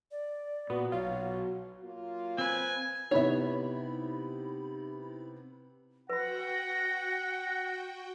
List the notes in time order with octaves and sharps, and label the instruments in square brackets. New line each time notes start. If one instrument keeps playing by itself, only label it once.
[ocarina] D5
[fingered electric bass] A#2 [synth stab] B3 [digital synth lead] F#4
[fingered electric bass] B1 [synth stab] F4 [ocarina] C#5
[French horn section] F#3 A#3 F4
[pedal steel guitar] C4 B4 [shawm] G#5
[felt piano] C3 B3 [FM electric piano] D#4 E4 B5 [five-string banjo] C#5 E5
[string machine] F#4 G5 [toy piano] B4 B5 [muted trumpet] F#5 [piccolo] A#6